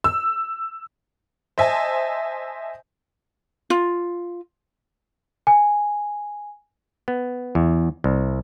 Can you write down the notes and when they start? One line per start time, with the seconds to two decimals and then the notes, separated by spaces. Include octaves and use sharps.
0.04 E6
1.58 C5 D#5 E5 G#5 A5
3.70 F4
5.47 G#5
7.08 B3
7.55 E2
8.04 C2